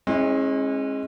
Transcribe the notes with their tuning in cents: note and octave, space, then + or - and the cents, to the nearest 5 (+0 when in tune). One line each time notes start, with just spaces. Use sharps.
G#3 +0 C#4 -40 E4 -30